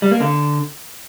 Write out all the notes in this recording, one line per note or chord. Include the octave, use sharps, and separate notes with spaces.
G3
A#3
D3